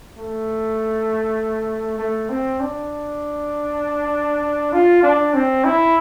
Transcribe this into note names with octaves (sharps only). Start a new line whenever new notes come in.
A3
A3
C4
D4
F4
D4
C4
E4